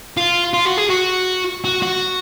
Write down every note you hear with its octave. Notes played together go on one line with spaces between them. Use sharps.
F4
F4
F#4
G#4
F#4
F#4
F#4